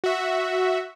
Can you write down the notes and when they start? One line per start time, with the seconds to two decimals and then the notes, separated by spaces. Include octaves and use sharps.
0.04 F#4 E5